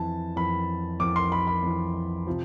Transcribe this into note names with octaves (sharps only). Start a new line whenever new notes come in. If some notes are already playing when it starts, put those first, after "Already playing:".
Already playing: F2 E3 A5
F2 E3 B5
F2 E3 D6
C6
B5
B5
F2 E3
C3 F3